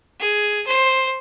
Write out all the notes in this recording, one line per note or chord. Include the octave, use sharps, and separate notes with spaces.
G#4
C5